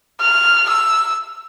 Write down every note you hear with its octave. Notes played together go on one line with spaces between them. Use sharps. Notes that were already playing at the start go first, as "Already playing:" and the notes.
F6
E6